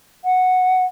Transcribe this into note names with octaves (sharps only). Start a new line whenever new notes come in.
F#5